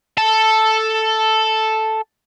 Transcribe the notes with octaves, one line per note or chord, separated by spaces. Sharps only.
A4 A5